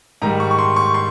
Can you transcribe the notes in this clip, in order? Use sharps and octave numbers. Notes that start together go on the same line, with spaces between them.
G#2 D#3 G3 A#5
C#6
C#6
C6
C#6
C6